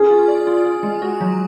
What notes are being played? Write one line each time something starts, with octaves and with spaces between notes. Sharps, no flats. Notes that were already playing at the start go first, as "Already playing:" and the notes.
Already playing: C#4 G#4
F4
D5
F4
F4
G#3
F#4
F#3